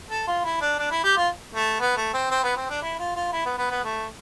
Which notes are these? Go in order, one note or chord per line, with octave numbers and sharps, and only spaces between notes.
A4
F4
E4
D4
D4
E4
G4
F4
A3
B3
A3
C4
C4
B3
C4
D4
E4
F4
F4
E4
B3
B3
B3
A3